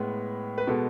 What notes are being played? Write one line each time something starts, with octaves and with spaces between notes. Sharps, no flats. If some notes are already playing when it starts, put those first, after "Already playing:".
Already playing: A2 G#3 B3
B4
B2 G#3 B3 A4